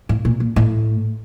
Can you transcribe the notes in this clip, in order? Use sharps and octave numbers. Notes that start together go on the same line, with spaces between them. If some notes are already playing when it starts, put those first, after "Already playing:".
A2
A#2
A#2
A2